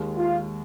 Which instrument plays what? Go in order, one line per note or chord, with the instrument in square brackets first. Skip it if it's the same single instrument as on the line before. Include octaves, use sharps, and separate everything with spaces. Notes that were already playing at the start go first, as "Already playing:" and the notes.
Already playing: [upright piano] D#2 D#3 G#3
[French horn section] F4